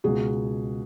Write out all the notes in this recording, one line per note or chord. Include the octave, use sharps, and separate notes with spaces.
C#2 B2 F#4 G#4